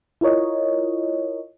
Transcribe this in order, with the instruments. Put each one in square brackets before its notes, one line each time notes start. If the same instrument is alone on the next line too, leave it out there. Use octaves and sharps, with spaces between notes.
[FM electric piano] E4 F4 A#4 C#5 D#5